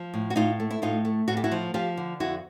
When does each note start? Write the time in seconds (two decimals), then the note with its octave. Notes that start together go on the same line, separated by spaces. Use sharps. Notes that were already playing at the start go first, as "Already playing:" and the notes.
Already playing: F3
0.14 A2
0.30 F#4
0.36 A2 D#4 F4
0.60 A3
0.70 E4
0.82 A2 D#4 F4
1.05 A3
1.28 A2 F#4
1.37 G4
1.44 E4 F#4
1.51 F3
1.74 F3 F4 G4
1.97 D3
2.20 F2 E4 F#4